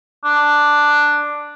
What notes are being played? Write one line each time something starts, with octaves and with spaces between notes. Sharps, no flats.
D4